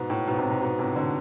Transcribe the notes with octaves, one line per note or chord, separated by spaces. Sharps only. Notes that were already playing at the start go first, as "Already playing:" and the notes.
Already playing: G#2 B2
A2
G#2 B2
A2 C3
G#2 B2
G#2 B2
A2 C3
B2 D3